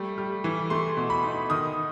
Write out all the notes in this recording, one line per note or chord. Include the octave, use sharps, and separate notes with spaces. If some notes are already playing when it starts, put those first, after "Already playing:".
Already playing: G3 A3
G3
E3
A3 C6
B2
B5
D#4
D#3 D#6